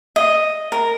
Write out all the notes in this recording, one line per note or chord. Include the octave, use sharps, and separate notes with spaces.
D#5
A#4